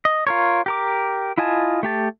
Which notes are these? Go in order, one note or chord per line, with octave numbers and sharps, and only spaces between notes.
D#5
F4 A#4 C#5
G4 A#4 D6
E4 F4 D#5 G#5 A5
A3 G4 A5